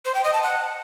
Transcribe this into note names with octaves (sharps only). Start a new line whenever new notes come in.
C5
G5
D#5
A5
F#5